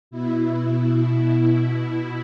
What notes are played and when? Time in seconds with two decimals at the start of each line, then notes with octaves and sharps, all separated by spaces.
0.11 B2 E4
0.77 B2